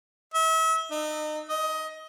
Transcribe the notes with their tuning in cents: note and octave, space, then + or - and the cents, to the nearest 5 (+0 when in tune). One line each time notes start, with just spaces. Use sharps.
E5 -35
D#4 -35
D#5 +20